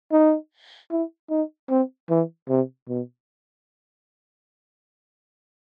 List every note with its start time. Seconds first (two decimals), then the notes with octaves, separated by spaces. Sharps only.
0.12 D#4
0.91 E4
1.30 D#4
1.70 C4
2.10 E3
2.49 C3
2.89 B2